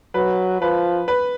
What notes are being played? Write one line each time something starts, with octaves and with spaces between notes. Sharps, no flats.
F#3 B4
F3 B4
B4